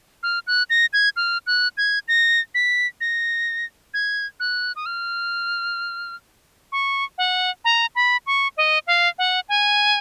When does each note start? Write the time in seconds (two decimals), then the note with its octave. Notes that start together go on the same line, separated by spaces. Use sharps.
0.23 F6
0.47 F#6
0.70 A#6
0.93 G#6
1.16 F6
1.47 F#6
1.77 G#6
2.08 A#6
2.55 B6
3.01 A#6
3.94 G#6
4.40 F#6
4.76 D#6
4.86 F6
6.72 C#6
7.18 F#5
7.65 A#5
7.95 B5
8.26 C#6
8.57 D#5
8.87 F5
9.18 F#5
9.49 G#5